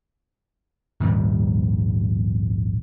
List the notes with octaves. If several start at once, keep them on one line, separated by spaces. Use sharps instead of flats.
A#1 D#2 G#2 G3